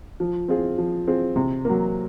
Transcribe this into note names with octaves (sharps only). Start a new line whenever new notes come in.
F3
C4 F4 G#4
F3
C4 F4 G#4
C3
F#3 A#3